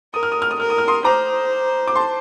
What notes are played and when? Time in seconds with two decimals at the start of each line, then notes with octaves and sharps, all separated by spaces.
0.13 A#4 D#6
0.23 F6
0.32 D#6
0.42 F6
0.51 D#6
0.59 A#4 F6
0.70 D#6
0.78 F6
0.88 C6 D#6
1.04 C5 A#5 D6
1.87 D6
1.95 A5 C6